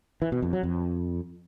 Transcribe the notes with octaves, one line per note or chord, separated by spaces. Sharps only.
E3
B2
F2
F#3
F2